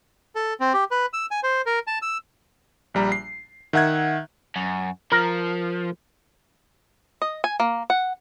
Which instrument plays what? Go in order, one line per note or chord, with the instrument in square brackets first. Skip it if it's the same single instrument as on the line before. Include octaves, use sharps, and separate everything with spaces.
[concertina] A4
C4
G4
B4
E6
G#5
C5
A#4
A5
E6
[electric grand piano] A#1 G3 A#5
C7
D#3 E5 F#5 F#6 G#6
[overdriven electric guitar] F#2
[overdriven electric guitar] F3 [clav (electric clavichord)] A#4
[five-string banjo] D#5
G#5
A#3
F#5